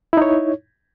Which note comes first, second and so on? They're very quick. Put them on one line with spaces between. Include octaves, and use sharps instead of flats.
E4 D#4 C#5